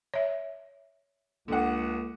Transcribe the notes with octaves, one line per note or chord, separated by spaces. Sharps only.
C#5 E5
C#2 D3 A#3 F#5